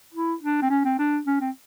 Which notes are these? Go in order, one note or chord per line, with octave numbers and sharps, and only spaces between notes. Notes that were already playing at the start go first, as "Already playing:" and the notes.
E4
D4
C4
C#4
C4
D4
C#4
C4